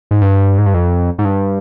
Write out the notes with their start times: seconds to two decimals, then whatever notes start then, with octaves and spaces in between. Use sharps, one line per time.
0.11 G#2
0.22 G2
0.58 G#2
0.66 G2
0.74 F2
1.18 G#2
1.25 G2